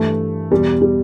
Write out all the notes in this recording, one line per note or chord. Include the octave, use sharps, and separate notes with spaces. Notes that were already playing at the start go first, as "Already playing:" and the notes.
Already playing: G2 E3 A3
E2 B2 G3
G3